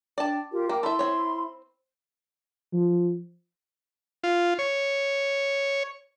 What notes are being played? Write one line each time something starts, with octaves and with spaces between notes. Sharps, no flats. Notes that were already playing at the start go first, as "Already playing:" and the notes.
D4 D5 G5 A5
F4 G4 A#4
A#3 G5 D6
E4 A4 E5 B5 C6
C4 C#5
F3
F4
C#5